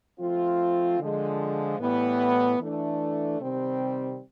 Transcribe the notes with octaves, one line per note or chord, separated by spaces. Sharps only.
F3 A3 C4 F4
D3 F3 G#3
A2 E3 G3 B3
E3 A3 D4
C3 D#3 G3 C4